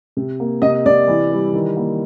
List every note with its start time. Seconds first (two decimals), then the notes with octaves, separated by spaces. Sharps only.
0.17 C3
0.40 A#3
0.62 C3 D#5
0.86 C3 D5
1.08 E3
1.32 G3
1.53 D#3
1.77 A#3